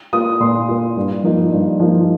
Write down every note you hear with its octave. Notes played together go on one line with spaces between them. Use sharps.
A#3 F4 D#6
A#2 C6
A#3 F4
G2
F3 A#3 D#4
G2
F3 A#3 D#4